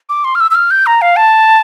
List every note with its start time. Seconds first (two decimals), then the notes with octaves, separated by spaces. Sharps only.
0.09 D6
0.24 C6
0.35 F6
0.40 E6
0.51 E6
0.55 F6
0.71 G6
0.86 A#5
1.02 F5
1.16 A5